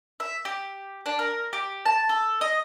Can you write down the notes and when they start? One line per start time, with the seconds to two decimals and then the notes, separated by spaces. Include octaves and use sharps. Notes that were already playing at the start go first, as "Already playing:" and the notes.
0.20 E5
0.45 G4
1.06 D4
1.19 A#4
1.53 G4
1.86 A5
2.09 A4
2.41 D#5